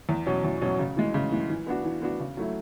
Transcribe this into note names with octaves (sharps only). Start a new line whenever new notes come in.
E2
B2 F#3 C#4
E2
B2 F#3 C#4
C#3
E3 G#3
C#3
E3 G#3
E3
B3 D4 F#4
E3
B3 D4 F#4
C#3
F#3 A3 E4